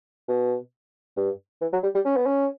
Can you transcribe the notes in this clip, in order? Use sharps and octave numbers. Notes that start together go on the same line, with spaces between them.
B2
G2
E3
F#3
G3
G3
C#4
B3
C#4